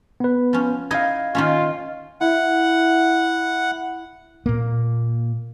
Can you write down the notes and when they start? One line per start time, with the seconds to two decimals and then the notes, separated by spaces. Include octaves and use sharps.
0.20 B3 B4
0.53 F3 C#4
0.91 D#4 E4 D#5 F5 G#6
1.35 D#3 A#3 C#4 F4
2.21 E4 F#5
4.46 A#2 A#3